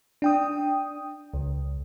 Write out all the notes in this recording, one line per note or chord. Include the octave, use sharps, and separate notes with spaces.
D4 G5 D#6
C#2